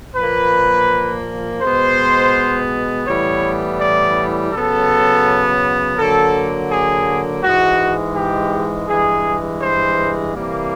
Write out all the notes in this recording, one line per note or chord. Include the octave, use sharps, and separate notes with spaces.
A#2 F3 A#3 B4
B2 G#3 B3 C5
A2 E3 G3 B3 C#5
D5
C#3 F#3 B3 A4
D3 F#3 A#3 A4
G#4
G#2 E3 G#3 F#4
G4
G2 E3 G#3 G#4
C5
C3 E3 G3 A#3